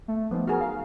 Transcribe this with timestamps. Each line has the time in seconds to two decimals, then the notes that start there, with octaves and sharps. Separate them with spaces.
0.08 A3
0.31 F3 B3 D#4
0.48 F#4 G#4 A#4 F6
0.61 F5